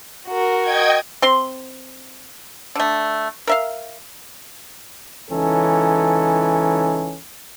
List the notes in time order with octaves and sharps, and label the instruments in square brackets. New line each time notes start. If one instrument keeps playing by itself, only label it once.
[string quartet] F#4 A#4
[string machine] D#5 G5 G#6
[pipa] C4 C6
D3 A3
A#4 E5 F5
[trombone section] C#2 E3 C#4 D#4 A4